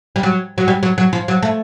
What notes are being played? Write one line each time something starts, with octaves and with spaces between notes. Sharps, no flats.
G3
F#3
F#3
G3
F#3
F#3
F3
F#3
A3